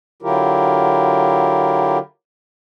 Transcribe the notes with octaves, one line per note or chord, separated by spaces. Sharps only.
D3 F#3 E4 F4 G4 A#4